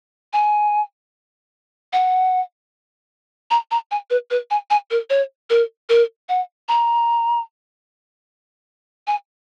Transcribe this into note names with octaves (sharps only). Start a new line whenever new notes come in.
G#5
F#5
A#5
A#5
G#5
B4
B4
G#5
G#5
A#4
C#5
A#4
A#4
F#5
A#5
G#5